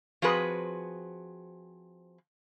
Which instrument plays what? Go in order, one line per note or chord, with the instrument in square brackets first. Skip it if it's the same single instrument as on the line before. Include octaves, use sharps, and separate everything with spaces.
[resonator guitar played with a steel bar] F3 C4 F#4 G#4 B4